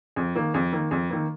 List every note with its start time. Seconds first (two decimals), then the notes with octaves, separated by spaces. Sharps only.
0.16 F2
0.36 D#3 A#3
0.54 F2
0.73 D#3 A#3
0.91 F2
1.10 D#3 A#3